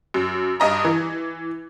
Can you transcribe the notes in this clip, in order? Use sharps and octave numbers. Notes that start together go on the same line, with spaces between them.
F#2
G2 D#5 A#5
E3